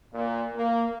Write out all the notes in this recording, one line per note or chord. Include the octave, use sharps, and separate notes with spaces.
A#2
A#3